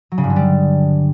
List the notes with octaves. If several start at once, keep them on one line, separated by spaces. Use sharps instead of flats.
F#3
C#3
G2
D3
G3